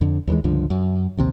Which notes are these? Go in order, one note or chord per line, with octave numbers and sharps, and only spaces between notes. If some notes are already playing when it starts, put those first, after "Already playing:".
F2 D3
D#2 E3 G#3
C#2 G2 D3 F3
F#2
A#1 D#2 C3